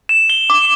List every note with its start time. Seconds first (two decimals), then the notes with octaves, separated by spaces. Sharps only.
0.09 E7
0.30 G7
0.50 D6